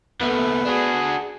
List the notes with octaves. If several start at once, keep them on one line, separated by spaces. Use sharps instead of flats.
D#2 A3 B3
D4 F#4 G#4